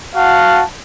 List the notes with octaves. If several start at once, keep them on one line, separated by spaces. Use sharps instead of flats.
F#4 F5 F#5 A5